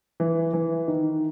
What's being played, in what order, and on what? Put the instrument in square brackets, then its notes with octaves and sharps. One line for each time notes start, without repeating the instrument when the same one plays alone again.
[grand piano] E3
E3
D#3